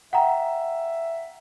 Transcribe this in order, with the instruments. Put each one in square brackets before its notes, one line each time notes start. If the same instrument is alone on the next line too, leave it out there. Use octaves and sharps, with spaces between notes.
[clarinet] E5 [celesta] F#5 G5 A#5